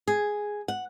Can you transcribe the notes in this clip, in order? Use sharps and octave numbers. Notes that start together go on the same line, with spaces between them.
G#4
F#5